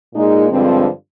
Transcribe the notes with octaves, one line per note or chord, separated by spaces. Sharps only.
A#2 G#3 D#4
G2 D3 F3 G#3 C4